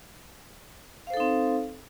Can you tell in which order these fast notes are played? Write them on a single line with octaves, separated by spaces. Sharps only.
F5 C5 A4 D#4 C4